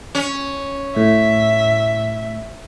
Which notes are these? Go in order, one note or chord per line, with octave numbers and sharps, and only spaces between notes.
C#4
A2 E5